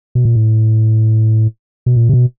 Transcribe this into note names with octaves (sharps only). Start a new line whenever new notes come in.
B2
A#2
A2
B2
A#2
C3
B2